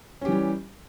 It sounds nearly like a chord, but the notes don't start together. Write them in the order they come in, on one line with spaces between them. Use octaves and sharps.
C#4 G4 E3 G3